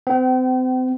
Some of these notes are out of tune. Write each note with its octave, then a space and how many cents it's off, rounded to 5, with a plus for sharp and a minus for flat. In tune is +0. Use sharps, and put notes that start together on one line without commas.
C4 -35 G5 -45